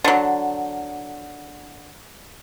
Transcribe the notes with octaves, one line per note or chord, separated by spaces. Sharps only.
D3 F#3